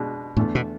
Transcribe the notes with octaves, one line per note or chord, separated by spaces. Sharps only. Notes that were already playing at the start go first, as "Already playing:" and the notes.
Already playing: B2 G#3 D4
E2 A2 D3 A3
B2